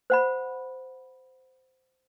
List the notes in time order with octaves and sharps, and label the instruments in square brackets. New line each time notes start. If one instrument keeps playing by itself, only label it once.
[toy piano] C5 F#5 B5